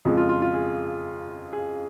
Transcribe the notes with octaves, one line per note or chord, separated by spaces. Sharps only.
F2 C#3 F3 G#3
F4
F4
F4
G#4
G#4